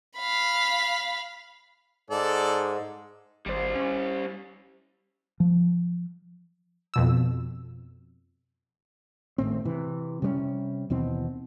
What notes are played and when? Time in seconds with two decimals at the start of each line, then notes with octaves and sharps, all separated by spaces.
0.17 F5 B5
2.10 G#2 A4 D5
3.46 G#1 G3 C5
3.76 C#4
5.40 F3
6.94 F2 B2 E6
9.38 G#1 A2 C4
9.65 C3 E3
10.22 C3 G3 A3 C#4
10.90 D#2 B2 E3 C4